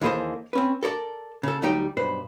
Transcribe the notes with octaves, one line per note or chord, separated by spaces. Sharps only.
D#2 E3 A#3 G#4 A4 C5
C4 C#4 B4
A4 A#4 C#5 D5
C#3 A4
D2 F#3 G3 D#4 G4 G5
B1 G2 B4 C5